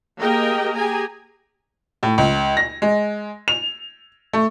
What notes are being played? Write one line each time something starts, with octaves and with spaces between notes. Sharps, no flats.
A#3 G4 G#4 A#4 D#5 G5
G4 G#4 G#5 A#5
A2
C#2
A#6
G#3
F7
A3